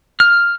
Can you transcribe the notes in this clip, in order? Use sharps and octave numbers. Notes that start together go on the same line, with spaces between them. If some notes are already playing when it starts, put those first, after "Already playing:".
F6